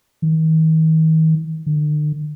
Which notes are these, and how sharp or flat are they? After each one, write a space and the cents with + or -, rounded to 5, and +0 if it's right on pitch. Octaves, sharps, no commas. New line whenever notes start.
D#3 +40
D3 +40